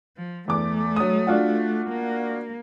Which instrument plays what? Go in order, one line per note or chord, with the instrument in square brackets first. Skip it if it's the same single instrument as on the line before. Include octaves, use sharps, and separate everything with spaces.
[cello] F3
[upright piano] E2 D6 [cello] A3
[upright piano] F#3 D#6
D4 F4 F#4
[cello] A#3